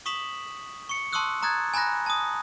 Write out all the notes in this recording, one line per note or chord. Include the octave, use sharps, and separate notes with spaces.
C#6 D#6 B6 E7 F#7
C#6 C#7
A5 C6 C#6 D#6 E6 F#6
A#5 D#6 F#6 G#6 A6
G#5 A#5 B5 F#6 A#6
A5 D#6